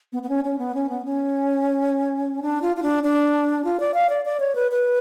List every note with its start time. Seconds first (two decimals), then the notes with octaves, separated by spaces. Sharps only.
0.13 B3
0.23 B3
0.29 C#4
0.44 C#4
0.59 B3
0.75 C#4
0.89 B3
1.05 C#4
2.42 D4
2.62 F4
2.76 F4
2.82 D4
3.03 D4
3.64 F4
3.80 D5
3.94 F5
4.09 D5
4.25 D5
4.40 C#5
4.55 B4
4.71 B4